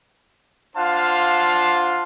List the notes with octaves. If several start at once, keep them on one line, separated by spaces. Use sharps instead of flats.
D4 F4 C5 F5 F#5 A5